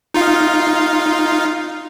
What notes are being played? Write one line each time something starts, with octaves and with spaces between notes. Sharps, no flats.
D#4 F4 F5